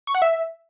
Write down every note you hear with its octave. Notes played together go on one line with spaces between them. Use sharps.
C#6
F#5
E5